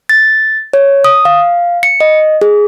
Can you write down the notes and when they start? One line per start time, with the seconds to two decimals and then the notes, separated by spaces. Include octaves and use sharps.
0.09 A6
0.73 C#5
1.04 D#6
1.25 F5
1.83 C#7
2.01 D#5
2.41 G#4